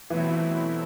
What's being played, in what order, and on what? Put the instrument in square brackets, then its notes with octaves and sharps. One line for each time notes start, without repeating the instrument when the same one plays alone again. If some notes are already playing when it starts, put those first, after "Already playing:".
[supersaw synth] B2 F#3 A3 C4 E4 [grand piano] E3